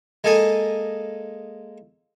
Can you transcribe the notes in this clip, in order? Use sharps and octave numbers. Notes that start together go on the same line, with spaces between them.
G#3 A#3 A4 G#5 D#6